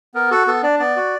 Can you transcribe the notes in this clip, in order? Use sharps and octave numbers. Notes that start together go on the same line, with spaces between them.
B3 A#4
F#4 A4
B3 A4
D4 D5
B3 D5
F#4